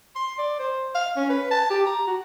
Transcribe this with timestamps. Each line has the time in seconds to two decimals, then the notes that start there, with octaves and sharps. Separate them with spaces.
0.15 C6
0.38 D5
0.59 C5
0.95 F5
1.17 C#4
1.29 B4
1.51 A5
1.70 G4
1.86 A#5
2.07 F#4